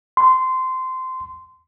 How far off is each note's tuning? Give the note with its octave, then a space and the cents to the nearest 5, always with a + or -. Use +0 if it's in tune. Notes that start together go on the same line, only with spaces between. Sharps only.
C6 -15